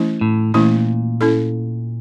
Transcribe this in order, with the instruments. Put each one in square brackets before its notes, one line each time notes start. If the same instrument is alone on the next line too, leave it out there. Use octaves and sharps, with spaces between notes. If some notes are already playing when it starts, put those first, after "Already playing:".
Already playing: [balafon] E3 A3 C#4 E4
[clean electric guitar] A2
[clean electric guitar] A#2 [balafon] E3 A3 C#4 E4
[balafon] C#4 E4 A4